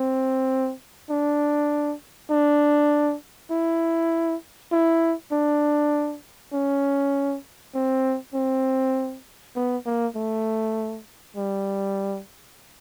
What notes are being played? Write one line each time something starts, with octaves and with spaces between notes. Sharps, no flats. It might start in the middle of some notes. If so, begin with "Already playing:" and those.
Already playing: C4
D4
D4
E4
E4
D4
C#4
C4
C4
B3
A#3
A3
G3